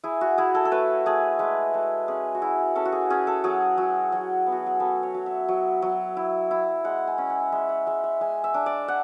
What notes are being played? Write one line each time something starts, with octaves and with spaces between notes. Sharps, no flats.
E4 G#4
F#4
E4 G#4
A4
A4
A3 B4
A3 G#4
G#3 B4
G#3 A4
C#4 G#4
F#4
E4 G#4
C#4 A4
F#4
G#4
C#4 G#4
A4
F#3 G#4
F#3
F#3
B3
F#4
G#4
B3 A4
C#5
F#3
E5
F#3
F#3
E4
E4
G#3 F#5
G#5
C#4
F#5
G#3 E5
F#5
G#3 E5
E5
G#3 G#5
E5
D4
D5
F#5